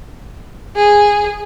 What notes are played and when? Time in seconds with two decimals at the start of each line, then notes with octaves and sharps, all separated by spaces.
0.76 G#4